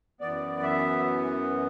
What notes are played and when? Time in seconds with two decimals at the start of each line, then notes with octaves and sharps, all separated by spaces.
0.21 F#2 E3 B3 D5
0.63 E5